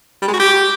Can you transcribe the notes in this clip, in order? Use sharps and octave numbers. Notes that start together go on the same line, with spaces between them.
G3
G#3
F#4
G4